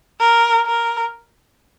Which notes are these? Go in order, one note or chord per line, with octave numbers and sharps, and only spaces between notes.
A#4
A#4